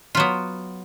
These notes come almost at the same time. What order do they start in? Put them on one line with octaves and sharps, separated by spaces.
F4 F#3 B3